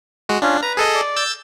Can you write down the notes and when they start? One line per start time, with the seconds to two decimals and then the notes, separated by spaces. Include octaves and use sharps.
0.29 G#3 F#4
0.42 C#4 D4 F4
0.63 B4 A#5
0.77 G#4 A4 D#5
0.95 D5
1.16 E6 G6 A6